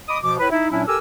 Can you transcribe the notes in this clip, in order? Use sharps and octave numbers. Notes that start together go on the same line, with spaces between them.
D#5 B5 D6 D#6
B2 F3 D6
A2 E4 B4
D#4 E4
A#2 F#3 C#4 D4 E4
G4 A4 A#4 G#5 D6 E6